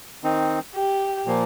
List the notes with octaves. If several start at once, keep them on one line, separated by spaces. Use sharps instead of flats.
D#3 C4 D#4
G4
A#2 F3 A#3